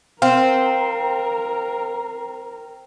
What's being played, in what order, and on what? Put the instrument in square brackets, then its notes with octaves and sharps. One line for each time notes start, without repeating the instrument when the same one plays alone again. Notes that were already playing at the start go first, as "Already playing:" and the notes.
[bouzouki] C4 [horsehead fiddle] A#4 [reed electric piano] F5